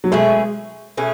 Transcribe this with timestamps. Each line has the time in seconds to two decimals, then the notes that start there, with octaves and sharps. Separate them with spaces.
0.04 F#3
0.12 B2 G#3 A3 C#4 G#4
0.97 B2 A3 C#4 G#4